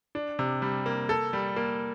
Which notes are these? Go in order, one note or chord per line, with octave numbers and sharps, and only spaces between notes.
D4
C3
G3
A#3
A4
G3
A#3